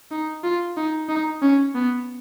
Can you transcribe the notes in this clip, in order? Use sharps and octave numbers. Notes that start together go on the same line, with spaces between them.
D#4
F4
D#4
D#4
C#4
B3